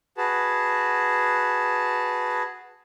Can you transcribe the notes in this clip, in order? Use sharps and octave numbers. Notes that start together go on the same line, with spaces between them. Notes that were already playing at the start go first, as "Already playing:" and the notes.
F#4 G#4 B4 A5